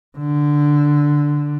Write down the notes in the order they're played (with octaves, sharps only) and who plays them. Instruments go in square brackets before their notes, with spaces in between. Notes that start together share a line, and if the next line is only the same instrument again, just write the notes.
[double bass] D3